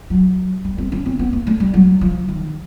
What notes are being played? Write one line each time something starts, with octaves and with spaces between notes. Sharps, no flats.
F#3
G3
C4
C#4
C4
B3
A#3
A3
G3
F#3
F3
D#3